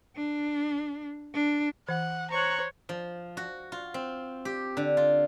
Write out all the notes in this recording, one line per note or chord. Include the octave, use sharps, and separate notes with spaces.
D4
D4
E3 F#5
C5 C#5 A#5 C#6 F#6
F3
F#4
F4
C4
G4
D3
F4